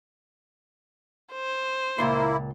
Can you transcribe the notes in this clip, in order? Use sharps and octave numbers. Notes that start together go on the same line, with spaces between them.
C5
C#2 A#2 A#3 E4 C6